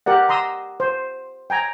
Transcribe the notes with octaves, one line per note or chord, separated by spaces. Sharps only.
G4 A#4 D5 F#5
A#5 C6 D#6 E6
C5
G5 G#5 A#5